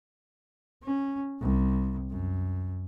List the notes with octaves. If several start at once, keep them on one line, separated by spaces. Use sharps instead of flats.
C#4
C2
F#2